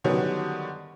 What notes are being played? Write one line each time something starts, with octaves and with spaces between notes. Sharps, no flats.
D3 D#3 F#3 G3 B3 C#4